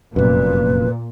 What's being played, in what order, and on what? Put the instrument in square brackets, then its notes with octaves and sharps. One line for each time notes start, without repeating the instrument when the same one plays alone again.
[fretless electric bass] F1 F#2 [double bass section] A#2 [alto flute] B4